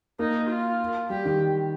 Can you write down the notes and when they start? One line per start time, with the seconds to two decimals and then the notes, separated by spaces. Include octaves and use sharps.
0.19 A#3 D#4
0.50 F4
1.10 G3 G4
1.25 D#3